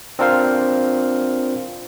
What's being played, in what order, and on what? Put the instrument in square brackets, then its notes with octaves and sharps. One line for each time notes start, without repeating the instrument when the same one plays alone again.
[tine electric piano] C4 D4 F4 A#4 C5 F5